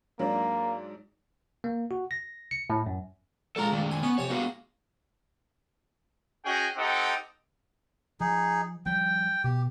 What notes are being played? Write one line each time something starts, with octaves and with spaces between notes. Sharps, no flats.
G#2 F#3 A#3 D4
A#3
F#4
A#6
C#7
A2
F#2
A#1 G#2 F4 A4 A#5
D#3 A3
G#5
B3 C#4
F2 C3 C#5 G#5
A#3 B3 F#4 G#4
C#4 F#4 G#4 D#5 G5
C4 D#4 G4 A4 F#5
F3 D#4 G#4
F3 G3 G5
B2 G4